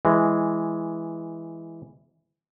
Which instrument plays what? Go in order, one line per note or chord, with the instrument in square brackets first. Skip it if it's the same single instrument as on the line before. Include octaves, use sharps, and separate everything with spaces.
[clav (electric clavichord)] E3 G#3